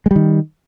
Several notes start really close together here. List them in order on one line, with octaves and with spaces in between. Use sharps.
G#3 G3 D#3